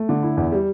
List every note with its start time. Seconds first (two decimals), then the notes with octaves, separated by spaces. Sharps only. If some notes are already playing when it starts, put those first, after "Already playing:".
Already playing: A3
0.09 D3
0.23 E4
0.37 E2
0.52 G3